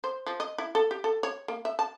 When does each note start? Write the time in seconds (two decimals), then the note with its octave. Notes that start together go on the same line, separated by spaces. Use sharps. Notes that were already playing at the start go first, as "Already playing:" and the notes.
0.04 C5
0.27 F3
0.40 D#5
0.58 E4
0.75 A4
0.91 G4
1.04 A4
1.23 C#5
1.48 A#3
1.65 E5
1.79 A5